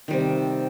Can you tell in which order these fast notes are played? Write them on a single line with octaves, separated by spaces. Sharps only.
D#3 G3 C3